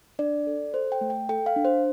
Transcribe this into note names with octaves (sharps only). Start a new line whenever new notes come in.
D4 D5
A4
A4 C5
G5
A3
G5
A4 G5
F5
D4
C5